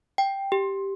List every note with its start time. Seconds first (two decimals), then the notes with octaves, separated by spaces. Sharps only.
0.18 G5
0.52 G4